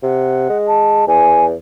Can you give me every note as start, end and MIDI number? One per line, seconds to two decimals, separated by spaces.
0.03 0.48 48
0.03 0.57 78
0.50 1.07 56
0.67 1.04 81
1.07 1.55 40
1.07 1.45 80